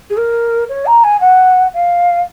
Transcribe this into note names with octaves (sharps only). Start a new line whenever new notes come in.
G#4
A#4
C#5
A#5
G#5
F#5
F5